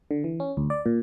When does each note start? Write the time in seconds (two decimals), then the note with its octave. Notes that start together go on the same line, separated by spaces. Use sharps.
0.11 D3
0.24 E3
0.40 C#4
0.57 D2
0.70 D5
0.86 A#2